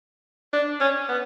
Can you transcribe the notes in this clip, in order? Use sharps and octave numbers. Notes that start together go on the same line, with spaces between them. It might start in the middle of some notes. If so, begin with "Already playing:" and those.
D4
C#4
B3